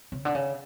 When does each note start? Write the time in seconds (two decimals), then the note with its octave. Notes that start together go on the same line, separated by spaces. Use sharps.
0.12 C#3
0.25 D3
0.35 C#3